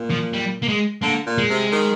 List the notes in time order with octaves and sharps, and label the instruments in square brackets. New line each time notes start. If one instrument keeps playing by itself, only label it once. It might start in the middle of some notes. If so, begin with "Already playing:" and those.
Already playing: [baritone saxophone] A#2
[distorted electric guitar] F3
G3
A#3
G#3
[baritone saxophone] D3 [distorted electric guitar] A#3
[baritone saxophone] A#2
[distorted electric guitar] G#3
[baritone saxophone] C3
D#3